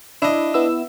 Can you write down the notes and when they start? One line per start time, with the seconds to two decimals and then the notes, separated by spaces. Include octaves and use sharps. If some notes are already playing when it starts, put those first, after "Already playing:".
0.22 D4 E4 D#5
0.54 B3 E4 E6